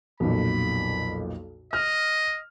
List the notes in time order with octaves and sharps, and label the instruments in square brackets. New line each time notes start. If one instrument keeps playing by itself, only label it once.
[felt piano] B1 F2 A#2 [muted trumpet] B5
[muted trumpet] D#5 [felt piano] F6